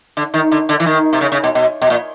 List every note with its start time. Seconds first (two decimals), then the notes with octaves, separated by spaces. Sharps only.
0.17 D3
0.34 D#3
0.52 D3
0.69 D3
0.80 E3
0.86 D#3
1.13 C3
1.21 C#3
1.32 C#3
1.44 B2
1.55 B2
1.82 B2
1.90 A#2